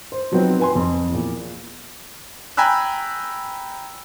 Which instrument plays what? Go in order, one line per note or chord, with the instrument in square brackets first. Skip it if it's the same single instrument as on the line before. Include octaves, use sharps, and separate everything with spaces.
[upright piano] C5
F3 F#3 B3 C4 D#4
B4 G#5 C6
F2
E2 A#2
[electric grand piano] G5 G#5 A#5 B5 E6 F#6